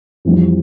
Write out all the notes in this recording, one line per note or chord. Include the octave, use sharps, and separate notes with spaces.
F2 E3 G3